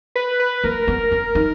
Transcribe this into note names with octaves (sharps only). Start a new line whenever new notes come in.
B4
B4
A#3 A#4
B3
C#4
D#4